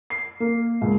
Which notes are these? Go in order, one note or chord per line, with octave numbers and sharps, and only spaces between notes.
C7
A#3
C#2